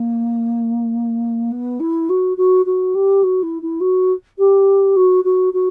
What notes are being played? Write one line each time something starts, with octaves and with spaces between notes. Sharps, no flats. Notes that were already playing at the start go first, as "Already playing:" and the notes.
Already playing: A#3
B3
E4
F#4
F#4
F#4
G4
F#4
E4
E4
F#4
G4
F#4
F#4
F#4